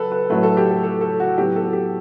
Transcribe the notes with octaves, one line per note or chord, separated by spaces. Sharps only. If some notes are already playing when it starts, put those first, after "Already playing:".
Already playing: F#3 A4 B4
B4
A2 F#3 A3 B4
A4
G4
A4
A4
A4
F#4
A2 F#3 B3 G4
A4
G4